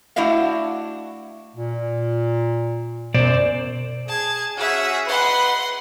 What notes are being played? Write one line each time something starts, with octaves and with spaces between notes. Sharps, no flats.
A3 D4 E4 F#4 D#5 F5
A#2
F#2 B2 C5 D5
G#4 A5 G#6
C#4 F#4 G#4 E5 F#5
D#4 B4 F#5 C6